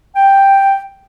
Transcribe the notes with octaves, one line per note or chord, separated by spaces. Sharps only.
G5